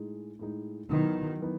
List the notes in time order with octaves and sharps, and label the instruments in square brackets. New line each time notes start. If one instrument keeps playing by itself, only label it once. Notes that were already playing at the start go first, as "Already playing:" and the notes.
Already playing: [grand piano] A2 G#3 D#4 G#4
A2 G#3 D#4 G#4
[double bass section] D#3 F#3 [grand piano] E3 B3 D#4
[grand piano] E3 B3 D#4